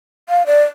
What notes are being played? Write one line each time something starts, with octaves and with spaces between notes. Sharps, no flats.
F5
D5